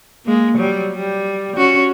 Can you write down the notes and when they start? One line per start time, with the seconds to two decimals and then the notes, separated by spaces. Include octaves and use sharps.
0.25 G#3 A#3
0.57 F#3 G3
0.92 G3
1.56 C#4 F#4